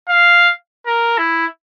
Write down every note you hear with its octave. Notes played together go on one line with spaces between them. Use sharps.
F5
A#4
E4